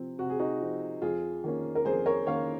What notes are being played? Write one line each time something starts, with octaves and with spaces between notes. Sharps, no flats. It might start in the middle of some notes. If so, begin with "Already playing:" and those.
Already playing: C3 F3 C4
C3 F#4
G#4
D#4 F#4
F3 C4
F2 F4 G#4
D#3 A#3 C#4
A#4
F2 G#4 C5
A#4 C#5
D#3 A#3 C#4 C#5 F5